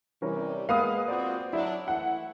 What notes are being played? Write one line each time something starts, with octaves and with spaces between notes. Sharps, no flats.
C3 E3 G3 C#4 A#4
G#3 A#3 B3 B4 F5 D#6
C4 F4 F#4 C5 D5
F#3 D4 E4
E3 A3 E4 F#5